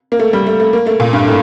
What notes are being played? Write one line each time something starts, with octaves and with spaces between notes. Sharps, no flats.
A#3
A3
G3
A3
A3
A#3
A3
A#2
G2
A2